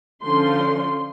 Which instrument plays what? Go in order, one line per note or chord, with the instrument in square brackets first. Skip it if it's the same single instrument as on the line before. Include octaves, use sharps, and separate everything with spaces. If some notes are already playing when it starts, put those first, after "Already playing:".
[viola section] D3 F3 C#4 C6